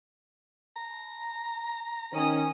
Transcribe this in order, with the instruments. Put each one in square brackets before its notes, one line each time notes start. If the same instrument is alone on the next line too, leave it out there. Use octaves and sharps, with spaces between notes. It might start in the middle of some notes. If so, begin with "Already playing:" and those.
[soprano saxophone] A#5
[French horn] D#3 [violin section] C#4 D#6